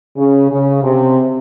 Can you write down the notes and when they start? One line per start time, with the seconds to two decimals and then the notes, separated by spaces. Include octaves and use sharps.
0.17 C#3
0.51 C#3
0.84 C3